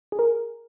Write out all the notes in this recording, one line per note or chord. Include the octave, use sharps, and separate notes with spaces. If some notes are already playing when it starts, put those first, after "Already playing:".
G#4
A#4